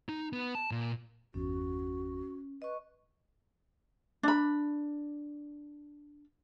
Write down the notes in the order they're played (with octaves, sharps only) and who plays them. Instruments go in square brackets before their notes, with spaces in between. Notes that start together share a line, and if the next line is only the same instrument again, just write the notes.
[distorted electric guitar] D#4
B3
A5
A#2
[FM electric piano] G1 E2 [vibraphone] C#4 [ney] F#4
[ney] B4 [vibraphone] D#5 C#6
[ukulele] D4 B5